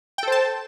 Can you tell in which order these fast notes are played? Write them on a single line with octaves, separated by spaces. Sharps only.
G5 A4 C5 A5